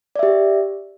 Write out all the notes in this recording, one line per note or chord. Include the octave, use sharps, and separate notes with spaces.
G4 D5 E5